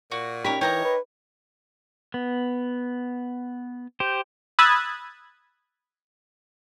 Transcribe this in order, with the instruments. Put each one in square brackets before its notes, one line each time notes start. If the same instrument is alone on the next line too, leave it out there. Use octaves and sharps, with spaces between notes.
[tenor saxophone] A#2 [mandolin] F#4
[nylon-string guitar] C#4 D#4 G4 [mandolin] A#4 C#5 B5
[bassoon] E3 [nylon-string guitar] D#4 [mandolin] G4 A#4 D#5 [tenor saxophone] C#5
[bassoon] B4
[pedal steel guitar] B3
G4 C5
[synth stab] B5 D#6 E6 F#6 G#6 A6